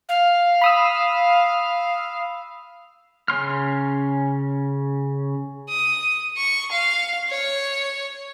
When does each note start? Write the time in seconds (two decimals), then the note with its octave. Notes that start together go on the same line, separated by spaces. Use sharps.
0.09 F5
0.62 B5 D#6 E6
3.28 C#3 C#4 C6 F6
5.69 D#6
6.37 C#6
6.72 F5
7.29 C#5